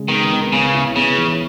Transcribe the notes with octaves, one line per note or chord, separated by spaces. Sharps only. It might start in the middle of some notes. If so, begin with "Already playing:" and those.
Already playing: C#3 G#3
D#3 B3
B3
C#3 B3
E4
C#3 B3
E3